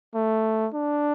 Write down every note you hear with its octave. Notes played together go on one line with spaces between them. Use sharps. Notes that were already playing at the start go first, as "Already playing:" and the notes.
A3
D4